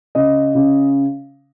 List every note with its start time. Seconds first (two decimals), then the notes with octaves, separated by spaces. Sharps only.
0.15 C#3 D#5
0.55 C#3